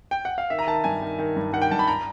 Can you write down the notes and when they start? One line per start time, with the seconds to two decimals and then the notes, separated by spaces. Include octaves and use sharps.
0.11 G5
0.25 F#5
0.38 F5
0.50 D#3 E5
0.59 A#5
0.67 D#3 A5
0.84 G2 G#5
1.02 D#3
1.19 D#3
1.36 G2
1.53 D#3 F#5
1.62 G5
1.71 G2 A5
1.79 B5
1.88 A#5